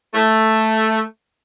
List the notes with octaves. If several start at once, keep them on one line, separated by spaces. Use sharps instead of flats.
A3